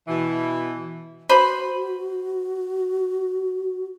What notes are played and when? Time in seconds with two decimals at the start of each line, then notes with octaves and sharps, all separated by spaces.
0.08 B2 E3
1.29 F#4 B4 C5 B5